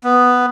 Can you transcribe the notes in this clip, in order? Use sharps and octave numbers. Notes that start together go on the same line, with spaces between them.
B3